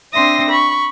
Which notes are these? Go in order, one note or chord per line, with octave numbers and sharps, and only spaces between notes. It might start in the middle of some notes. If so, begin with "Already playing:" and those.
C4 D4 E5 C6 D#6 A#6
B5 C#6